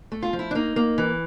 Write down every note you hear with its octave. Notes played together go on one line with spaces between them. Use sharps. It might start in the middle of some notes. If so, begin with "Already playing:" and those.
A3
F4
F3
E4
D4
A#3 D#4
A#3
E3